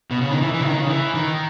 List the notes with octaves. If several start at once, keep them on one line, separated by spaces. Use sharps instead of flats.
B2
C#3
D#3
E3
E3
C#3
D#3
C#3
E3
D#3